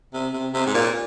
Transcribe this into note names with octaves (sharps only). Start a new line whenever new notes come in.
C3
C3
C3
G#2
A#2